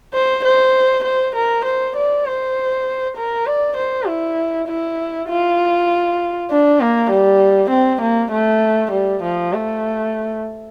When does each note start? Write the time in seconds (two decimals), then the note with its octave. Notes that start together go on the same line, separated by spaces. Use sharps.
0.14 C5
0.44 C5
1.04 C5
1.35 A#4
1.65 C5
1.96 D5
2.26 C5
3.17 A#4
3.46 D5
3.77 C5
4.07 E4
4.67 E4
5.28 F4
6.50 D4
6.80 A#3
7.11 G3
7.70 C4
8.01 A#3
8.31 A3
8.91 G3
9.23 F3
9.53 A3